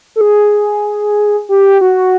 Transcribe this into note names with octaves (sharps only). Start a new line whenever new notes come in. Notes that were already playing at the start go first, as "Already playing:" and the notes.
A4
G#4
G4
F#4